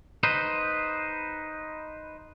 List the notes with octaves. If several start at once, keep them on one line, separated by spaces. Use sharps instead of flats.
D#4 B4 C5